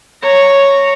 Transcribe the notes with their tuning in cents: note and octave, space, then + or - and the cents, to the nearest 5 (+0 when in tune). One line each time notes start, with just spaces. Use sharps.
C#5 +0 A#5 -10